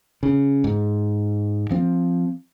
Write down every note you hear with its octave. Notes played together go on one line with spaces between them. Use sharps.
C#3
G#2
F3 C4